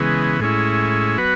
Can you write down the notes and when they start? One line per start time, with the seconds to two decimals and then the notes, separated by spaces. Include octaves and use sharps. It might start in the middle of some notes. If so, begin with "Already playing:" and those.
Already playing: C#3 E3 G#3 B3
0.40 A2 G#3 C#4 E4
1.18 F#3 B3 F#4 B4